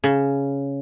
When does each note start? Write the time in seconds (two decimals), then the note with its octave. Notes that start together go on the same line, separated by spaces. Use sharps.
0.04 C#3